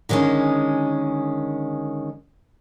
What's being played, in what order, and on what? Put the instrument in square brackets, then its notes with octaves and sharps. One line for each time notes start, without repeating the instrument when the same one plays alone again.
[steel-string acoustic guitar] D3 D#3 G#3 C4 C#4